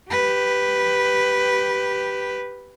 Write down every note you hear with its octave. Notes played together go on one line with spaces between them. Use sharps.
G4 B4